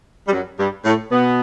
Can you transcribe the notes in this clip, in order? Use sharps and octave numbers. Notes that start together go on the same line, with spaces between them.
G3
F#2 F#3
G2 G3
A2 A3
B2 B3